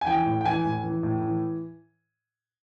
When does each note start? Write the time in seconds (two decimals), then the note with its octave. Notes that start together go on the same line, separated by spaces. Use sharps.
0.01 G#5
0.06 E3 G5
0.26 A2
0.41 G5
0.45 E3 G#5
0.65 A2
0.83 E3
1.03 A2
1.21 E3